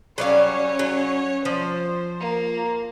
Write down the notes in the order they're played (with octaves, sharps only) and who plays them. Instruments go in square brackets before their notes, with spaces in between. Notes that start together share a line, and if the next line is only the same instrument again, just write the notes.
[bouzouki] F#3 G3 F5 [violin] C#4 C#5
[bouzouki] F#3
[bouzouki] F3 [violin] C5
[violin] A#3